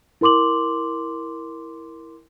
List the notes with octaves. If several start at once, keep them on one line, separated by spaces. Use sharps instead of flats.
E4 A#4 C6 D6 F#7